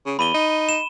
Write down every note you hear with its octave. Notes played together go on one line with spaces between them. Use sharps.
C#3
E2 B5 D#7 G7
D#4
E7